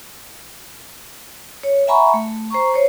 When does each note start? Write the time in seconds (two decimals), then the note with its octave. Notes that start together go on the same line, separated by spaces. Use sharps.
1.63 C#5
1.87 E5 F#5 G#5 A#5 B5 C#6
2.14 A3
2.50 C5 A#5 C#6
2.74 C5 C#5